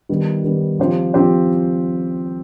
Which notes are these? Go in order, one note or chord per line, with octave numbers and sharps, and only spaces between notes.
D#3 G3 B3
D#3 G3 B3
F3 C4 G4 C5
F3 C4 G4 C5